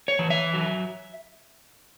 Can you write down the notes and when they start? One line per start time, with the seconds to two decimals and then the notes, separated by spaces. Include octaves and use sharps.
0.08 C#5
0.19 E3
0.30 E5
0.53 F#3